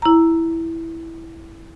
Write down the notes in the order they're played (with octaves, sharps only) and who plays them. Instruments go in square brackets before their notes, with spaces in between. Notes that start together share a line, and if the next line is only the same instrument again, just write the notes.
[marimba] E4 A#5